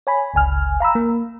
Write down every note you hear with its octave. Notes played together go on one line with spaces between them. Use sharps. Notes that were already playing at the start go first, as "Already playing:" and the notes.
C#5 G#5 B5
G1 C#2 G#5 F6
F5 A#5 B5 E6
A#3